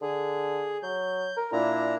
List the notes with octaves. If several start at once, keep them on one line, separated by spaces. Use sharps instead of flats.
D3 G#4
F#3 G6
A#4
A#2 D4 E4 A#5